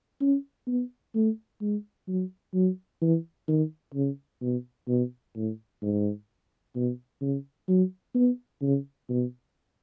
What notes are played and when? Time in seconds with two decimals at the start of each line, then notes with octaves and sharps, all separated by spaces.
0.21 C#4
0.67 B3
1.15 A3
1.61 G#3
2.08 F#3
2.54 F#3
3.01 E3
3.48 D#3
3.94 C#3
4.41 B2
4.88 B2
5.36 A2
5.82 G#2
6.75 B2
7.21 C#3
7.69 F#3
8.15 B3
8.62 C#3
9.09 B2